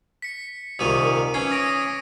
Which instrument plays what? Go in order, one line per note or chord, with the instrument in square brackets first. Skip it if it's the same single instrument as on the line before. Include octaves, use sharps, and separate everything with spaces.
[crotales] B6 C#7
[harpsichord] C2 A#2 D#3 [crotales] D#6 D#7 F7
[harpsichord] E3 C#4 [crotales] G#6 C7
[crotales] D#6 A#6 D7